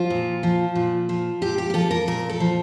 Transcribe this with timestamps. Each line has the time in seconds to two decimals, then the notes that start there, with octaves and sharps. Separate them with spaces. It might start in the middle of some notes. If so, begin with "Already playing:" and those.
Already playing: F3 F4
0.10 A#2
0.43 F3
0.75 A#2
1.09 F3
1.42 A#2 G4
1.58 G4
1.70 G4
1.74 F3 A4
1.91 A#4
2.07 A#2 A#4
2.29 A4
2.40 F3